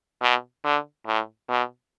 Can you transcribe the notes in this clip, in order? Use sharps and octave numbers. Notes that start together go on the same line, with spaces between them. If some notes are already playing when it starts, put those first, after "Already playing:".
B2
D3
A2
B2